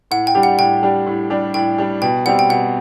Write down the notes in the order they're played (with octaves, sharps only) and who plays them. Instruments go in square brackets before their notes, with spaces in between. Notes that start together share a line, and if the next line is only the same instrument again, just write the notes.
[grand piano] A2 [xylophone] F#5
[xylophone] G5
[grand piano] G3 D4 G4
[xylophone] F#5
[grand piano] A2 [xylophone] G5
[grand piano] G3 D4 G4
A2
G3 D4 G4
[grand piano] A2 [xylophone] G5
[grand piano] G3 D4 G4
[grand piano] B2 [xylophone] G5
[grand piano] G3 C4 G4 [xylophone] F#5
[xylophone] G5
[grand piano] B2 [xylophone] F#5